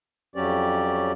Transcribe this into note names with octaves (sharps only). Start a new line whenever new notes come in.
F2 F#3 C#4 G4 D5